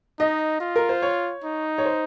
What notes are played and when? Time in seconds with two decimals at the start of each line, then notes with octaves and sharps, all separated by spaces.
0.19 D#4 D#5
0.60 F4
0.76 A#4
0.89 C5
1.02 C#5
1.44 D#4
1.78 C#5
1.85 C5